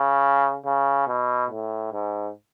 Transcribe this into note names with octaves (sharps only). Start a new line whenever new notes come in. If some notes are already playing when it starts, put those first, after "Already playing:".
Already playing: C#3
C#3
B2
A2
G#2